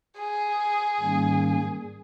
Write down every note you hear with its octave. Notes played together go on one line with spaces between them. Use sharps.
G#4
G#2 D#3 G3 A#3 C#4